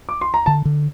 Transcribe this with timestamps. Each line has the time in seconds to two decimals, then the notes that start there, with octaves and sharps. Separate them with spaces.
0.09 D6
0.21 C6
0.34 A#5
0.46 D3 A5
0.65 D3